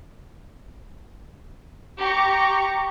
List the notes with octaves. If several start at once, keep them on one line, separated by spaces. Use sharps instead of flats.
G4 A#5 C#6